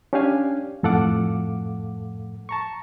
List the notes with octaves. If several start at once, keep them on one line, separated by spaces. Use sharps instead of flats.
C#4 D4 G4 D5 F5 G#5
F2 A2 A4 F5 F#5 D6
A5 A#5 C#6